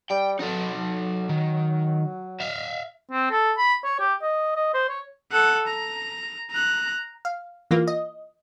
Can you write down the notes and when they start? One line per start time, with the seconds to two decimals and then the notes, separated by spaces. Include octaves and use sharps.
0.10 G3 G5
0.39 F#3 D#4 A4
1.29 D#3
2.41 E5 F5
3.11 C4
3.31 A4
3.58 B5
3.84 C#5
4.00 G4
4.22 D#5
4.56 D#5
4.74 C5
4.89 C#5
5.32 A4 F#5
5.67 A#5
6.51 A#5 F#6
7.25 F5
7.71 E3 A#3 F4
7.87 D#5